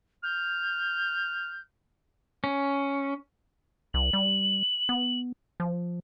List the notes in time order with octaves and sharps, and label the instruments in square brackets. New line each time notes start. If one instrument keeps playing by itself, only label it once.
[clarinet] F6 [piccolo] G6
[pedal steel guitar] C#4
[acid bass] C2 [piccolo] F#7
[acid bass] G3
B3
F3